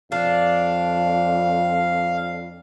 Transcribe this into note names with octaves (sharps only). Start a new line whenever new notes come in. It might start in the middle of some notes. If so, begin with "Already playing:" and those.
F2 D4 F5